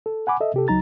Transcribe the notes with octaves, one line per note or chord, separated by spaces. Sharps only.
A4
F#5 G#5 B5 D6
A4 D#5 E5
C3 G4 A4
C#2 F#3 D#4 A#5 A6